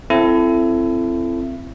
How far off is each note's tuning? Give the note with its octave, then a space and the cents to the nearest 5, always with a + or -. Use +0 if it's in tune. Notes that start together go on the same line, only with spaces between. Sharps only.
C4 +0 E4 +30 A4 -5